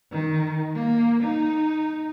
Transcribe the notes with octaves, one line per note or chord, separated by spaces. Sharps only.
D#3
A#3
D#4